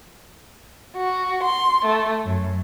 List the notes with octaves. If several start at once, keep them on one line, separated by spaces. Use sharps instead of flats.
F#4
C6
A3
F#2